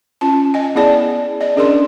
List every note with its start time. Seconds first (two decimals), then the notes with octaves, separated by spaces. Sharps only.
0.21 C#4 F4 A5
0.54 D#5 G#5
0.75 B3 E4 G#4 D5 A5
1.41 D5 D#5
1.56 C#4 D4 G#4 A#4 D5 C6